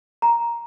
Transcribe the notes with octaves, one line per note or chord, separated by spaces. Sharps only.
A#5